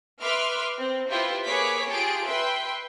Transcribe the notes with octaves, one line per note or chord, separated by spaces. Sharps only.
B4 E5 C6 D6 F6
C4
E4 F4 G4 B4 C5 E5
A#3 G#4 B4 C#5 D6 B6
F4 G4 G#4 A5 D7
B4 E5 G5 C6